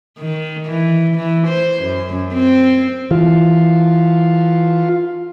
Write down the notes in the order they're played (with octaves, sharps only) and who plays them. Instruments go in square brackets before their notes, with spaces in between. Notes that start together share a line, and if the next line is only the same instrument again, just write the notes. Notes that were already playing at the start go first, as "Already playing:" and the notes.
[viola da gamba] D#3
E3
E3
C5
F#2
C4
[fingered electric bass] E3 [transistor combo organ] F4